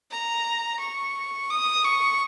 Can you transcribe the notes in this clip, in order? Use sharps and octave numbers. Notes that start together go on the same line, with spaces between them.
A#5
C#6
D#6
C#6